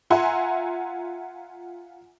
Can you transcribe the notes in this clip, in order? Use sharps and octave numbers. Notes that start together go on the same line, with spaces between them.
F4 E5 F#5 G#5 A#5 C6